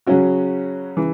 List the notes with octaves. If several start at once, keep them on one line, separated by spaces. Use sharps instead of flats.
C#3 F#3 C#4 F#4
C#3 E3